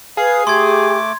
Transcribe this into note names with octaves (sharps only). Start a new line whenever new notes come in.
G#4 B4 F5
A3 G4 C6 D6 G#6